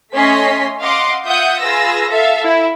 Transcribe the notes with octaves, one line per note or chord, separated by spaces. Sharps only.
A3 C#4 D#5 C6 B6
D#5 F5 F#5 C6 D6
F4 E5 F#5 D#6 G6
F4 G#4 B4 E6 A#6
A4 E5 F5
E4